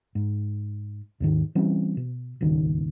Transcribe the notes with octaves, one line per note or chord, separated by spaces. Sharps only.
G#2
D#2 G#2 D#3
E3 G3 C4 C#4
B2
D#1 G#1 C#2 D#3